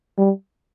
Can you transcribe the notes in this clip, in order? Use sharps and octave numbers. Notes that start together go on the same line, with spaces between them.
G3